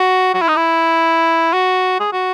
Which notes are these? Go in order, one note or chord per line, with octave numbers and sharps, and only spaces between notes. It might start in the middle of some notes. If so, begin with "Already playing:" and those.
Already playing: F#4
F#4
E4
D#4
E4
F#4
G#4
F#4